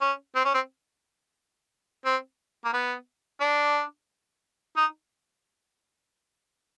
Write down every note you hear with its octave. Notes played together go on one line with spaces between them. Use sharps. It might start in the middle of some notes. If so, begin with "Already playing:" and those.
C#4
C4
C#4
C4
C4
A#3
B3
D4
D#4